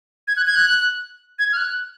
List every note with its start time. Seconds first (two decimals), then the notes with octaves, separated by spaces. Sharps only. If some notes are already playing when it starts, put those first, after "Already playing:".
0.28 G#6
0.37 F#6
0.47 G#6
0.55 F#6
1.39 G#6
1.52 F6
1.57 F#6